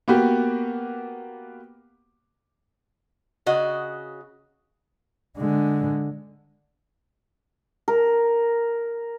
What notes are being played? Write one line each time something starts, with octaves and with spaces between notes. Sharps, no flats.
A#3 B3 F#4 G4
C#3 F#4 D#5
D3 G#3
A#4